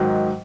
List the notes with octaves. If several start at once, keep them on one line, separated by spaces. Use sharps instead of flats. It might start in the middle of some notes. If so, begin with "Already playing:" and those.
Already playing: G#2 D#3 F#3